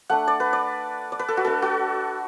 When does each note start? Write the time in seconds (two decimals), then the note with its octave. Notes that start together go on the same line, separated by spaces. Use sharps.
0.10 A3 D4 F#5
0.28 D5
0.40 B4
0.53 D5
1.12 D5
1.19 B4
1.28 A4
1.37 F#4
1.45 A3 D4 A4
1.62 F#4